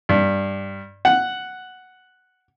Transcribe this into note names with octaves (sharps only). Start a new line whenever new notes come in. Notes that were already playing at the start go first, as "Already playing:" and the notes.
G2
F#5